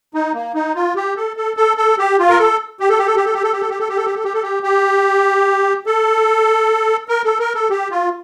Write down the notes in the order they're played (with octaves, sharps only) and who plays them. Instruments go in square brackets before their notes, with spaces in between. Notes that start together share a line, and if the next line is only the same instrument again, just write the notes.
[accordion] D#4
A#3
D#4
F4
G4
A4
A4
A4
A4
G4
F4
A#4
A4
G4
A4
G4
A4
G4
A4
G4
A4
G4
A4
G4
A4
G4
A4
G4
A4
G4
A4
G4
G4
A4
A#4
A4
A#4
A4
G4
F4